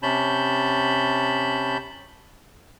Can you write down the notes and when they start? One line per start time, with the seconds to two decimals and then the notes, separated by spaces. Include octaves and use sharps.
0.03 C3 C#4 A5 B5 G6